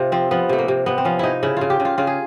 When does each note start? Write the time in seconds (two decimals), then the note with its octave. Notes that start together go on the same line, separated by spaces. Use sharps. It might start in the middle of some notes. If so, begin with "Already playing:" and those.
Already playing: C3 F4
0.12 F3 C4
0.31 F3 B3
0.49 C3 A3
0.59 A#3
0.68 C3
0.86 C3 B3
0.98 C4
1.05 F3 C#4
1.19 C3 D#4 E4
1.43 C#3 E4
1.57 C#3 F4
1.70 G4
1.80 C#3
1.85 F4
1.98 C#3 F4
2.07 G#4